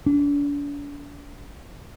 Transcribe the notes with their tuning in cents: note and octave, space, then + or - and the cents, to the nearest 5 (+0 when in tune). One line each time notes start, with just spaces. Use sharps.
D4 -40